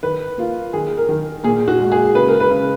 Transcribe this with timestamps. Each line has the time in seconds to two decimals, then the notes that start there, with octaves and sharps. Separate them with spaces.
0.03 D#3 B4
0.38 A#3 F4
0.73 D#3 G#4
0.97 A#4
1.09 D#3
1.44 A#2 G#4
1.68 F#4
1.80 G#3
1.92 G#4
2.14 C#3 B4
2.28 A#4
2.40 B4
2.50 C#3